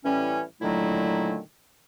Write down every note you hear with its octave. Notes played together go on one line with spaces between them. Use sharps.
A2 E3 G3 C#4
A#2 D3 D#3 F#3 A3 E4